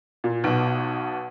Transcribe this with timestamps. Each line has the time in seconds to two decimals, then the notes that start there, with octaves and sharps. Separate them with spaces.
0.24 A#2
0.44 B1 B2